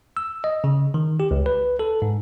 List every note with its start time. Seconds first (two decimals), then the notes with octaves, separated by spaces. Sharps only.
0.17 E6
0.44 D#5
0.64 C#3
0.94 D#3
1.20 G4
1.31 C#2
1.46 B4
1.79 A4
2.02 G#2